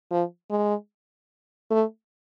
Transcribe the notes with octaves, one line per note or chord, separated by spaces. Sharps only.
F3
G#3
A3